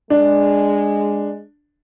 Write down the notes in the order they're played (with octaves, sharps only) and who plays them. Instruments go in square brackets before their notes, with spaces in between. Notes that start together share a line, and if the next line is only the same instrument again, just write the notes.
[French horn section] G#3 [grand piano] D4